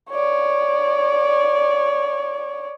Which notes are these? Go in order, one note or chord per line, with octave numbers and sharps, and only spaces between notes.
C#5 D5